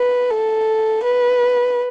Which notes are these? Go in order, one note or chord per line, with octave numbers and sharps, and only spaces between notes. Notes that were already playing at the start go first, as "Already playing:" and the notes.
Already playing: B4
A4
B4